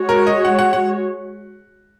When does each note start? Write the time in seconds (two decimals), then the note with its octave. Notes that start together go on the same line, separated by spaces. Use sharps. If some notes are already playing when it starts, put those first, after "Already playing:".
Already playing: G#3 F#4 C#5
0.09 A#4
0.27 D#5
0.45 F#5
0.59 F#5
0.73 F#5